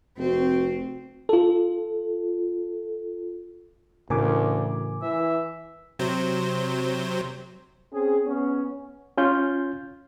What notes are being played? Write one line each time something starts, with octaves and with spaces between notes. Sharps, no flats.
F1 C4 F#4
F4 A4
D2 A2 C#3 E3 A#4 G#5 D6
E3 E5
C3 F#3 C5
C4 C#4 G#4
B3 C#4
C#4 F4 G6